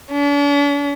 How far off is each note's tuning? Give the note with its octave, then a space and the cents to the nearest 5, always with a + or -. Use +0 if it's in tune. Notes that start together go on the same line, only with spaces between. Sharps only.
D4 -45